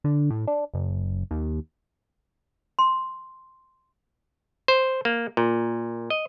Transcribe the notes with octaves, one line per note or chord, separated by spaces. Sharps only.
D3
A2
D4
F#1
D#2
C6
C5
A#3
A#2
D#5